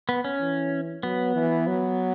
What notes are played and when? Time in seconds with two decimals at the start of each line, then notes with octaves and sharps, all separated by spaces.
0.09 B3
0.25 C#4
0.41 E3
1.03 F#3 B3
1.36 E3
1.67 F#3